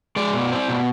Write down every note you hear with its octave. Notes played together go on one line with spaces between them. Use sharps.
G#3 D5
B2
C4
B2